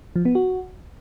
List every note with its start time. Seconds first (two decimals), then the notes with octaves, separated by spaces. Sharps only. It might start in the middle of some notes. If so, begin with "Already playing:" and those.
0.16 F3
0.25 B3
0.35 F#4